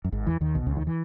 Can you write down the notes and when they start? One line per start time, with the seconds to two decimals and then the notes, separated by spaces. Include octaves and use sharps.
0.05 F#2
0.12 G#1 G#2
0.27 E2 E3
0.41 D#2 D#3
0.55 B1 B2
0.67 C#2 C#3
0.76 D#2 D#3
0.87 E3